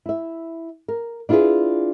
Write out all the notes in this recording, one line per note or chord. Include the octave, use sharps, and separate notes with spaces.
E4 E5
A#4
D4 E4 F4 G4 G#4 B4